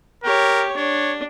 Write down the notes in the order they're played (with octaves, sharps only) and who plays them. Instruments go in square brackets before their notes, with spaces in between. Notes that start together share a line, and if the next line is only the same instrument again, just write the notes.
[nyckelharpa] G4 C#5 [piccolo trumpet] A#4
[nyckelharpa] D4 [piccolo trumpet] C#5